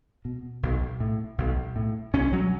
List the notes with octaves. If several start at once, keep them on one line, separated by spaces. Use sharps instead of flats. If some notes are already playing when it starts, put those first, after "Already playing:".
B2
B1
A2
B1
A2
B1 C#4
F#3